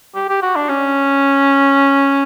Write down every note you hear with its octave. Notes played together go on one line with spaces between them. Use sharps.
G4
G4
F#4
D4
C#4